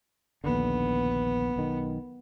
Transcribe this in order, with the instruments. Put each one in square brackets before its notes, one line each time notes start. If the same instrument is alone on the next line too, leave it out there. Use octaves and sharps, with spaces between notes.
[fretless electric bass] A#1 D#2 D3 [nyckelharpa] B3
[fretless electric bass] B1 D#3